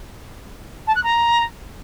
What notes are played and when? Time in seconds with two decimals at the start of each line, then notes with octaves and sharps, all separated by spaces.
0.87 A5
0.95 F#6
1.03 A#5